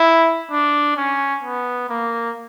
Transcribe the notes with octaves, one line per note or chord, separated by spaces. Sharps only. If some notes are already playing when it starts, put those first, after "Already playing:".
Already playing: E4
D4
C#4
B3
A#3